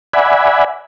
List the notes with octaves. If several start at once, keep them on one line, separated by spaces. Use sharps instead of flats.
D5 E5 F#5 G#5 B5